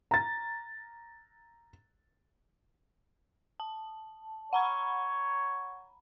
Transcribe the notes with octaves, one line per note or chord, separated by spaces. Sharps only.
A#5 A6
A5
C#5 F#5 A#5 B5